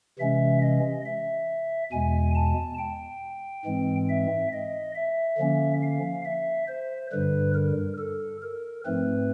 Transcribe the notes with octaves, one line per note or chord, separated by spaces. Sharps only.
C3 E3 G#3 C#4 E5
D#5
E5
E2 B2 G#3 G#5
A5
G5
G#2 E3 G#3 C4
E5
D#5
E5
D3 F3 A#3 C#4
F5
E5
C5
G2 D3 G3 B4
A#4
A4
A#4
G#2 F3 A3 C4 B4